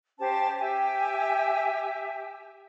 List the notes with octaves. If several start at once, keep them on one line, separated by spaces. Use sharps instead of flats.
C#4 G4 C5 A5
G4 E5 G#5